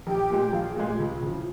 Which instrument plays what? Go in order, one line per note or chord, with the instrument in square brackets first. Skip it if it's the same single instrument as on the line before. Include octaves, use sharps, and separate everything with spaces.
[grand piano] A#1 [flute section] G4 G5
[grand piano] A#2 G#3
[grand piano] A#1 [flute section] F4 F5
[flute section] G#4
[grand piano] A#2 G#3
[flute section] G4
[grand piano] C#2 [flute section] F4
[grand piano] C#3 F3 [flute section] E4